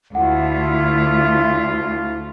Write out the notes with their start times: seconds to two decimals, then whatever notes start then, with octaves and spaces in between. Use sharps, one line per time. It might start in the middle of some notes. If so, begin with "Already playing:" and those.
0.15 D2 E4 F4 F#5